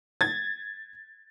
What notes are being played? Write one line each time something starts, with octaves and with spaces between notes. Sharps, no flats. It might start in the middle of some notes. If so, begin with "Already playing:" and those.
G#6 A6